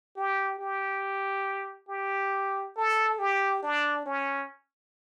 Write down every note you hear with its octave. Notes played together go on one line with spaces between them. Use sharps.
G4
G4
G4
A4
G4
D4
C#4